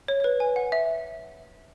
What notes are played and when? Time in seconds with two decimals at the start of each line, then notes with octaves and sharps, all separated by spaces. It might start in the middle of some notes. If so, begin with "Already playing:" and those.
0.08 C#5
0.20 C#5
0.24 B4
0.40 G#5
0.56 F#5
0.72 E5